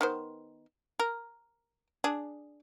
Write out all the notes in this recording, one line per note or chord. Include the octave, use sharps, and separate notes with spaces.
D#3 B3 C5
A#4
D4 G#4